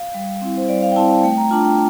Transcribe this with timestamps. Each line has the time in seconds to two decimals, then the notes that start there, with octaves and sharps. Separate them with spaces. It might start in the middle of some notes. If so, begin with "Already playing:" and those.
Already playing: F5
0.14 G3
0.41 C4 E4
0.57 C5
0.69 G3 D5
0.83 F5
0.92 G5
0.96 C4 E4 A5
1.10 A5
1.23 A3 G5
1.37 A#5
1.51 D4 F4 A5
1.65 G5